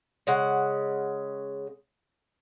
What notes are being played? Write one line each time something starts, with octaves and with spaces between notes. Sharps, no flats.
C#3 G#3 F#5